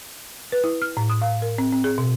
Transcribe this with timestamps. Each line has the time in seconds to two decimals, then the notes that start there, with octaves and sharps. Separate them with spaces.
0.52 B4
0.64 E4
0.82 F6
0.97 A2
1.10 D#6
1.22 F5
1.42 A#4
1.58 C4
1.72 C4
1.84 G#4
1.98 B2